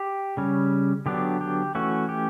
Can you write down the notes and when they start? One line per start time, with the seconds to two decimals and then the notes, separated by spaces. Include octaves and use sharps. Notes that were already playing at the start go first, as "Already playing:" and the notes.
Already playing: G4
0.37 C#3 G3 C#4
1.06 D3 F#3 B3 D4 G4
1.41 G4
1.75 E3 A3 C#4 F#4
2.09 G4